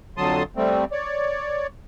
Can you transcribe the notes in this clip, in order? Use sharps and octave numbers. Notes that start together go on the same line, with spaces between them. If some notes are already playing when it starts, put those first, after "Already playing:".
F2 D3 F#3 A5 C6 D#6
G3 A3 C4
C#5 D5